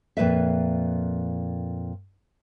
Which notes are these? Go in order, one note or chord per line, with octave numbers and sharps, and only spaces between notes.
F2 A#2 B4 E5